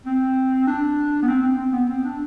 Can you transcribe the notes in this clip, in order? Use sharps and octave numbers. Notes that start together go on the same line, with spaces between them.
C4
D4
B3
C4
C4
C4
B3
C4
D4